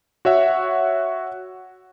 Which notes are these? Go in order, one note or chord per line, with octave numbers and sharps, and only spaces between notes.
F#4 C#5 E5 F#5